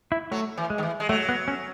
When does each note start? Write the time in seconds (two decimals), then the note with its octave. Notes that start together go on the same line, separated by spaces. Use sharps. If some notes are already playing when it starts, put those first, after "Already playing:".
0.12 E4
0.31 F#3 A3
0.58 E3
0.70 G#3
0.78 D#3
0.83 E3
1.00 G#3
1.09 F#3 A3
1.29 B3
1.48 C#4